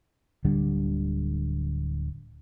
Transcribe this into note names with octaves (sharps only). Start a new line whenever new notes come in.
D1 D3 G3